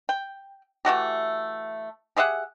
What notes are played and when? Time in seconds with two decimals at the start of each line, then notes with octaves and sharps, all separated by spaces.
0.09 G5
0.85 E3 A3 F#4 G4
2.17 G4 G#4 E5 F#5